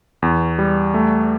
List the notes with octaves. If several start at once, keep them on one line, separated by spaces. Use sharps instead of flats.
E2
G3
A3